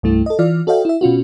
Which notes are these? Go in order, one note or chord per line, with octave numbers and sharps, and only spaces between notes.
C2 G2 A3 E4
A4 D#5
E3 F4 D5 F6
F#4 A4 C#5 D#5 F5 G5
E4 E5
B2 C#4 F4 F#4